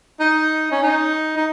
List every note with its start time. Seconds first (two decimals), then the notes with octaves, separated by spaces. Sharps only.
0.20 D#4
0.71 C#4
0.83 D#4
1.37 D#4